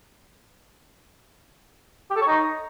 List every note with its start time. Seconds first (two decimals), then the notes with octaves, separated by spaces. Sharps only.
2.10 G4
2.16 A4
2.22 C#5
2.27 D#4